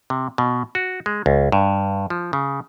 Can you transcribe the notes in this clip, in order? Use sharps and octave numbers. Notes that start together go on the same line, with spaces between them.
C3
B2
F#4
G#3
C#2
G2
F3
C#3